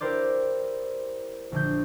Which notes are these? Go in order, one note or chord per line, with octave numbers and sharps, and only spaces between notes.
E4 G4 A#4 C5 D5
A#1 D3 G6